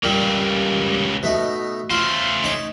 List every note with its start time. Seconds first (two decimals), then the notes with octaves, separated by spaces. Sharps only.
0.03 C#2 A#2 G3 A#3
1.23 B2 A3 D#4
1.90 A3 F4 C5
2.44 D#4 C#5